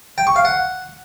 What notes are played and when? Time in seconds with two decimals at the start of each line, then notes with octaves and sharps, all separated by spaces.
0.18 G5
0.27 C#6
0.36 F5
0.45 F#5